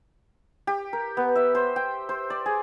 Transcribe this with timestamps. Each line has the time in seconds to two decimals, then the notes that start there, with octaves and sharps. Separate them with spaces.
0.67 G4
0.93 A#4
1.17 B3
1.36 E5
1.55 C5
1.76 G5
2.09 C5
2.30 D5
2.46 G#4